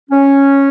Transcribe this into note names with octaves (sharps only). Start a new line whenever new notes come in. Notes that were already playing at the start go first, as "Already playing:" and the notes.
C#4